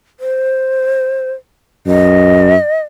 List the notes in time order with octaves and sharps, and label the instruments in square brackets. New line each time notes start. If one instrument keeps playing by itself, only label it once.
[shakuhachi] C5
[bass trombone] F#2 [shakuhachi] D#5